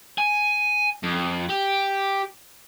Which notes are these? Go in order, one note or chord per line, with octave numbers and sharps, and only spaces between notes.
G#5
F2
G4